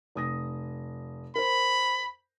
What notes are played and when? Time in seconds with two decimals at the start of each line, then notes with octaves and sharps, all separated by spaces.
0.15 F1 D#6 A#6
1.36 A#4 C5 B5